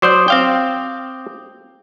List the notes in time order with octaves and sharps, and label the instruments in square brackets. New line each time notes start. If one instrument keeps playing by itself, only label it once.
[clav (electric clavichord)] F#3 C5 D5 [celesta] D6 D#6 G6
[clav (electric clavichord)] C4 F5 G5